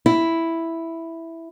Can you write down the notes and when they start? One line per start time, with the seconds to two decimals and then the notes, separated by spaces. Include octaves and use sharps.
0.06 E4